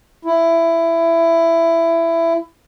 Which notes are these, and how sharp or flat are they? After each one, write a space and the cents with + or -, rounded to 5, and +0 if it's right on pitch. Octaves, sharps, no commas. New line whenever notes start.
E4 +15